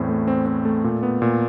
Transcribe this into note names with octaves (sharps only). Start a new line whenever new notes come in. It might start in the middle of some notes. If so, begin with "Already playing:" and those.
Already playing: E2 A2 C4
A3
C4
C4
A3
A#2
B3
A#2